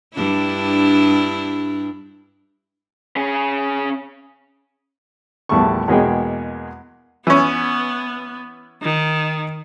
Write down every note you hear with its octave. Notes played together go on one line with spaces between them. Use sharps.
G2 D4 E4
C#4 G#4
A#1 E2 G3 A3 A5 C#6
E2 B2 G#3 A#3 G#4 G5
E3 B3 C#4
D#3